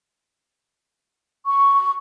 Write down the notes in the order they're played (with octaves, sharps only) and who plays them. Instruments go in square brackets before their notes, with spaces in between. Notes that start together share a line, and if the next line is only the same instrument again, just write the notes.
[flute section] C#6